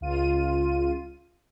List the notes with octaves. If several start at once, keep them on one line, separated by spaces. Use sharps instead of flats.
C#2 F4 D#7